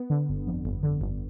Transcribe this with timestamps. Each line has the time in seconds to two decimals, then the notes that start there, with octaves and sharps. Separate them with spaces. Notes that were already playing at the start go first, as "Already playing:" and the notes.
Already playing: B3
0.10 D3
0.29 G1
0.47 F2
0.65 G1
0.83 D3
1.01 G1